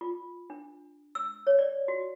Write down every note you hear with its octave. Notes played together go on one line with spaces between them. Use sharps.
F4
D4
E6
C#5
D5
F#4